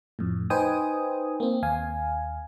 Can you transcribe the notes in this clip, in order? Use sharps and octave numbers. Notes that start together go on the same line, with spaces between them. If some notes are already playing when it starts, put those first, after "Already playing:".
F2 A2
D#4 B4 C5 G5 G#5 D#6
A#3 C4
D#2 F5 G#5